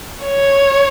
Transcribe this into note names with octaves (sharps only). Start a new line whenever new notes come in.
C#5